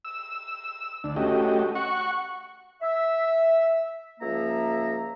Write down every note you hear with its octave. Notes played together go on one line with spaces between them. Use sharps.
E6
D2 D4
A3 C#4 F#4 G4 D#5
F#5 C#6
E5
C#2 F3 A#3 E5 A#5